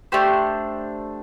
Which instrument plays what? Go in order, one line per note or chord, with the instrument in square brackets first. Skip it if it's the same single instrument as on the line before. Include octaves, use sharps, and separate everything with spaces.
[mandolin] A3 D4 G4 C5